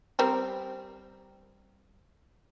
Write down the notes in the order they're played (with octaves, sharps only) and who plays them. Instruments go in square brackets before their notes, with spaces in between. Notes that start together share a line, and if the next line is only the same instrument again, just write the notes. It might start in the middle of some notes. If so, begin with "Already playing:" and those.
[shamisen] G3 C4 A#4